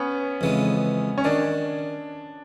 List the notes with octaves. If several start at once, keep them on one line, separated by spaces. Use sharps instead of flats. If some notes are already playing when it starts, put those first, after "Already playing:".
Already playing: B3 C#4
F2 C#3 E3 G#3
C#4
D#3 D4